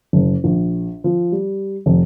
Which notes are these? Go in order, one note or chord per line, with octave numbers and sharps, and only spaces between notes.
F#1
A#1
F3
G3
F1